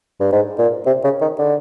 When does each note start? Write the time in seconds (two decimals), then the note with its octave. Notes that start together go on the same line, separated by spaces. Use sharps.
0.20 G2
0.32 G#2
0.59 A#2
0.86 C3
1.04 C#3
1.21 D#3
1.39 D3